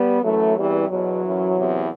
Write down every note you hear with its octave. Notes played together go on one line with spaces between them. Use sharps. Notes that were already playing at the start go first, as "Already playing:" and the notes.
Already playing: G3 B3
F#2 E3 F#3 A3
E2 C3 E3 G3
E2 B2 F#3
F#2 E3
E2 C3 E3